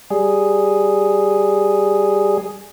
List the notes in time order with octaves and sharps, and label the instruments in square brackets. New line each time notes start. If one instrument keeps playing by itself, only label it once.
[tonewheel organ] G3 G#4